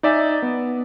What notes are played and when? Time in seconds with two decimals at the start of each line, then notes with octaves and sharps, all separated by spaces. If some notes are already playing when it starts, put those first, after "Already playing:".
0.03 D#4 D5 E5 G#5
0.42 B3